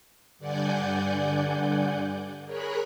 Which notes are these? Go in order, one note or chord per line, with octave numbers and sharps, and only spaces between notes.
G2 D3 D5 F#5 G#5 G6
G#4 A#4 C#5 B5 F#6